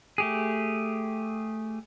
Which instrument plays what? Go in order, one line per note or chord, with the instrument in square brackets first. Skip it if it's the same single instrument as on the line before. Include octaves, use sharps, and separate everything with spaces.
[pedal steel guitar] A3 G4 G#4